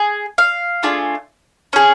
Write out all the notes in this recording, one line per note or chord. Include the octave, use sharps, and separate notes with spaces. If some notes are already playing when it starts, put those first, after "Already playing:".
Already playing: G#4
F5
A3 D4 F4 G#4
C#4 G#4